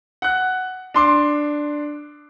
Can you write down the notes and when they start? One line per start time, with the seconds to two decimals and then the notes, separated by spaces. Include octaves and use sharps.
0.22 F#5 F#6
0.94 D4 C6 D6